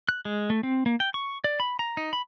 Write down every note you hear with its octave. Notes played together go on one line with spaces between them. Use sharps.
F#6
G#3
A3
C4
A#3
G5
C#6
D5
B5
A#5
D#4
B5